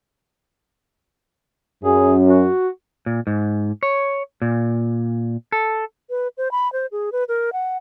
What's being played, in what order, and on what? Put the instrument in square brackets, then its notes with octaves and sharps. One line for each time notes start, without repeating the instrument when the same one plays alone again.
[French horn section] F#2 [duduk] G#4
[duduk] F#4
[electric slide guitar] A#2
G#2
C#5
A#2
A4
[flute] B4
C5
B5
C5
G#4
B4
A#4
F#5